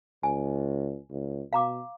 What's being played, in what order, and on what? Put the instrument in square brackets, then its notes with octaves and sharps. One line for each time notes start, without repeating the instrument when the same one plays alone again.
[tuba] C#2 [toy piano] G#5
[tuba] C#2
[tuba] B2 [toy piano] F5 A#5 D6